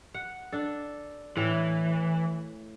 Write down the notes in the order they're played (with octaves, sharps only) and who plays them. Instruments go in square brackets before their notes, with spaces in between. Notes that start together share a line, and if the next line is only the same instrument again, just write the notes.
[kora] F#5
D4 A4
[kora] A2 [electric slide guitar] E3